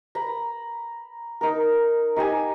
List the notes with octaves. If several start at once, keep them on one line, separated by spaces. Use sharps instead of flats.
A#5 B5
D#4 A#4
D#4 G4 D#5 G#5